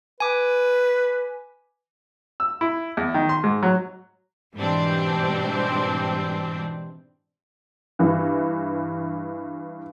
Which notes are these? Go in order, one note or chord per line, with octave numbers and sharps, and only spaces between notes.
B4 G#5 D6
E6
E4
E2
D#3
C6
G#2
F#3
G#2 B2 E3 G3 C4 D4
G2 E3